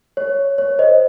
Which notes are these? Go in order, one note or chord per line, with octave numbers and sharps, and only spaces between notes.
C#5
C#5
C5 D#5